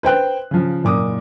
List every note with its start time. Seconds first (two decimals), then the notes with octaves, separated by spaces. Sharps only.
0.03 B4 C5 G5 F#6
0.51 C#3 F3
0.83 F#1 A#2 D6 D#6